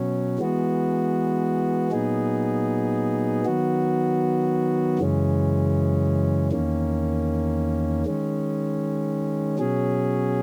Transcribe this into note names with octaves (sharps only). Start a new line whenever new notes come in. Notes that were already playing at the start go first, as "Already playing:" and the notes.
Already playing: B2 F#3 C#4
E3 G#3 B3 F#4
A#2 F#3 B3 D#4 G#4
D#3 F#3 B3 F#4
F#2 C#3 E3 G#3 C#4
E2 D#3 A#3 C#4
D#3 G#3 C#4
B2 F#3 C#4 G#4